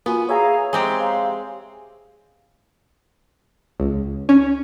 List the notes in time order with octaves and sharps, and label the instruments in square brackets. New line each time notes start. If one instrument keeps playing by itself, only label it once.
[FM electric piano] A#3 F4 F#4 [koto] B3 [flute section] G#5
[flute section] G#4 F5 A#5 [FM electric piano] C#5 E5 G#5
[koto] G#3 C4 G4 [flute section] A#5
[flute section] F5
[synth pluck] C#2
C#4